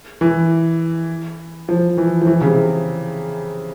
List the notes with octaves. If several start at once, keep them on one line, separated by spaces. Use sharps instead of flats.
E3
F3
E3
F3
E3
C#3
C3